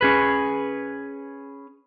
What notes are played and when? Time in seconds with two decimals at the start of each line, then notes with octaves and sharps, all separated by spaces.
0.01 C#4 G#4 B4